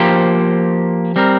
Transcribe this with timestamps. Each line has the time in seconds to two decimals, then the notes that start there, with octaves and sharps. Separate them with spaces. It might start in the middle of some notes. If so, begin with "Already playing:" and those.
Already playing: F3 A#3 G4 C5
1.16 G3 C4 A#4